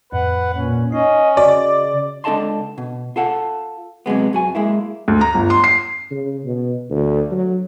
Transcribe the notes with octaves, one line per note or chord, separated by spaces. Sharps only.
F2 A2 B4 F#5
A#2 C#4
C#4 D#4 D#5
C#3 F#4 D5 D#5
C#2 D4 A4 D#5 A5 C6
B2
F4 A4 F#5
C3 F#3 G#3 B3
F#2 F#4 G#5
G#3 A#3 E4
D2
A#5
G1
C6
C7
C#3
B2
D2
F#3